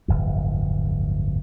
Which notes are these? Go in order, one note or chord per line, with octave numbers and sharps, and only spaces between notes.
D1 G1 F2